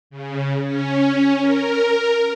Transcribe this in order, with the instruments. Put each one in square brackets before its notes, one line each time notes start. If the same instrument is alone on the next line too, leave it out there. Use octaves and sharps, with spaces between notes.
[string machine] C#3
C#4
A#4